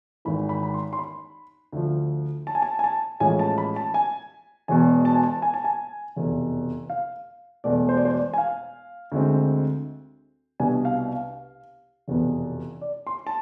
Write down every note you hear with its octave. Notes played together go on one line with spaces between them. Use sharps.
G#1 G#2 E3 B5
B5
B5
C6
C6
B5
D2 D3 F3
A5
G#5
A5
G#5
A5
A1 A2 F3 G#3 G#5
A5
B5
A5
G#5
E1 E2 B2 G#5
A5
G#5
A5
G#5
A5
G#5
F1 E2 B2
F5
E1 E2 B2 A3 D5
C5
D5
C5
D5
G#5
F5
D2 D3 G#3 C4
C2 B2 B3 D4 G#5
F5
F5
F1 E2 B2 B3
D5
C6
A5